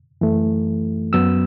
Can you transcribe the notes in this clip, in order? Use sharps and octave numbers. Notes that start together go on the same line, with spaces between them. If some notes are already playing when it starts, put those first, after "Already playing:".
F#2 E3 A3
F#2 F#3 B3 E6